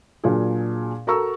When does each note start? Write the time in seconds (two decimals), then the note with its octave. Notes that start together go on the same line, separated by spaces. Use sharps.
0.24 A#2 F#3 D4 F4 G#4
1.07 F#4 A4 A#4 A#5 C#6 E6